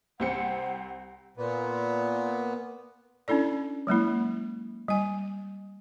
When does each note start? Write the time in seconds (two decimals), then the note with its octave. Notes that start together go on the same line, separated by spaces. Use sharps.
0.20 C2 C4 F#5 C#7
1.37 A#2 B3
3.28 C#4 D4 E4 A4 D5
3.87 F#3 G#3 A#3 E4
4.88 G3 G#5